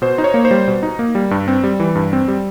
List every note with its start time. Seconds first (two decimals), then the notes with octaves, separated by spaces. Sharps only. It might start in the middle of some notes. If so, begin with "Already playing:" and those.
0.02 B2 C5
0.18 D#4
0.24 C#5
0.34 A#3
0.45 C5
0.51 G3
0.67 B2
0.83 D#4
0.99 A#3
1.15 G3
1.31 G2
1.48 C4
1.64 G3
1.80 E3
1.95 G2
2.13 C4
2.28 G3